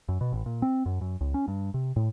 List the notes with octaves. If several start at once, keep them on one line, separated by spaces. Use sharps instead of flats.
F#2
B2
A1
A#2
C4
F#2
F#2
C#2
C#4
G2
C3
A2